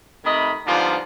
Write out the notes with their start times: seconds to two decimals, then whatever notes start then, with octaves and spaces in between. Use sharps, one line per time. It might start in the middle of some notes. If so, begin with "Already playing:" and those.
0.24 C3 D#3 A3 D#5 B5
0.66 G#2 D3 F3 G3 B3 F4